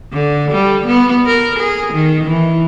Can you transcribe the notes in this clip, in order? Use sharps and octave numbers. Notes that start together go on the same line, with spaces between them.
D3
G3
B3
A#4
G#4
D#3
E3